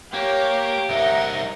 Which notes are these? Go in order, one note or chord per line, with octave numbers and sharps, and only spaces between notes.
A#3 G4 C#5
C2 D#4 A#4 E5 F#5